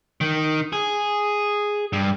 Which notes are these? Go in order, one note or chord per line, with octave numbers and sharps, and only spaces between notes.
D#3
G#4
G2